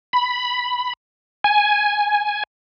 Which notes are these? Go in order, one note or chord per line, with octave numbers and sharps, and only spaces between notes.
B5
G#5